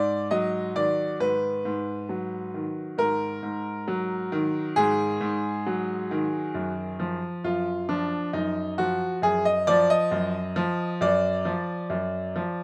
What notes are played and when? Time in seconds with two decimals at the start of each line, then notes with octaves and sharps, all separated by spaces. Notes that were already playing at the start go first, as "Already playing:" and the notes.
Already playing: G#2 D5
0.31 F#3 D#5
0.75 D#3 D5
1.20 G#2 B4
1.65 G#2
2.09 F#3
2.54 D#3
2.98 G#2 A#4
3.43 G#2
3.88 F#3
4.32 D#3
4.76 G#2 G#4
5.21 G#2
5.66 F#3
6.11 D#3
6.55 F#2
7.00 F3
7.44 F#2 F4
7.89 F3 D4
8.33 F#2 D#4
8.78 F3 F#4
9.22 F#2 G#4
9.45 D#5
9.67 F3 D5
9.90 D#5
10.11 F#2
10.56 F3
11.01 F#2 D5
11.45 F3
11.90 F#2
12.36 F3